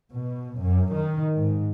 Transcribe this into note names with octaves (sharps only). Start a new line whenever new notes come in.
B2
F#2
D#3
G#2